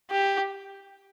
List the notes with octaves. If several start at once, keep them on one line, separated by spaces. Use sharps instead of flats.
G4